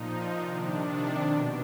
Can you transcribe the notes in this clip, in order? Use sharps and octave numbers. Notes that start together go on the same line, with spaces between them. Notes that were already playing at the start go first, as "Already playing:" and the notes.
Already playing: A#2 F3 D#4
C3 D#3 D4
B2